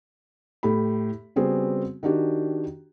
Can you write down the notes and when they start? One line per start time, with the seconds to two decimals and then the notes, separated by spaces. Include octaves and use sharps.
0.63 A2 G4 B5
1.36 C#3 G3 B3 C4 F#4 G#4
2.03 D#3 D4 F#4 G4